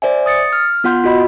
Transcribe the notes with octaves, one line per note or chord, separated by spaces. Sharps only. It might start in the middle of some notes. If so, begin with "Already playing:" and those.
C5 D5 E5 G#5
D#6 A6 C#7
F6
B3 F4 F#5 C6 G6
F4 F#4 D#5 B5